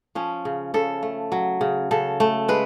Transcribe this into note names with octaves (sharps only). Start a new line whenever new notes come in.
F3 C#4
C#3
C#3 A4
A3
F#3
C#3
C#3 A4
A3
G#3 B4